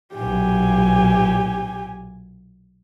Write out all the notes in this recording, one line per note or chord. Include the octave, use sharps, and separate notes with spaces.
B1 A#2 G4 G#5